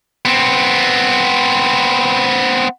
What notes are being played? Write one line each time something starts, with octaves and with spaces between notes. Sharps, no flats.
B3 C4